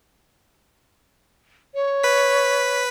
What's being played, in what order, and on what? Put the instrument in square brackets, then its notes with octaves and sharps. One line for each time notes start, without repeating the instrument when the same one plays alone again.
[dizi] C#5
[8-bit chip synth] B4 B6